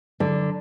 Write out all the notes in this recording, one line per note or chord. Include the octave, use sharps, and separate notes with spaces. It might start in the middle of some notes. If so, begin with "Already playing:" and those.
D3 F#3